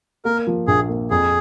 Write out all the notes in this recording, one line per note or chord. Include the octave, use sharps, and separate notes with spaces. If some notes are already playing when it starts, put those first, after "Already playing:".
A#3 A#4
F3
A#1 G#4
A#3
F2 G#4